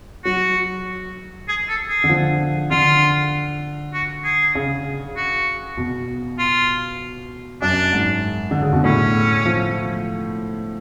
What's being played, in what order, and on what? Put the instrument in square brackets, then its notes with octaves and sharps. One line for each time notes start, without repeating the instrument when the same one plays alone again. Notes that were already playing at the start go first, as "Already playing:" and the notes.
[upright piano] F#3 [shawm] F#4
[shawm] G#4
A4
G#4
[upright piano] D3
F3
[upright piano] D3 [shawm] F4
[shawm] F#4
G#4
[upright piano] C#3
[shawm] F#4
[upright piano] B2
[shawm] F4
[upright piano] F#2 [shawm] D4
[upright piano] G#2
D3
C#3
B2
[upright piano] A2 [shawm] C#4
[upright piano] F3